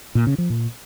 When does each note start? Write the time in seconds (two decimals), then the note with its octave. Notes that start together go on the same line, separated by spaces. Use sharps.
0.15 A#2
0.27 C#3
0.38 F3
0.50 A#2